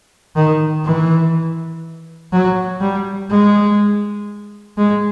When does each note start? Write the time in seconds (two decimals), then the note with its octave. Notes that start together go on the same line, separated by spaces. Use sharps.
0.36 D#3
0.85 E3
2.32 F#3
2.81 G3
3.30 G#3
4.77 G#3